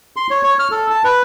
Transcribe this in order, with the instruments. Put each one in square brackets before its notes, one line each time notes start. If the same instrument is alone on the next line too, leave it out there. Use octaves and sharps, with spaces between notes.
[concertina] C6
C#5
C#5
F6
A4
A5
B4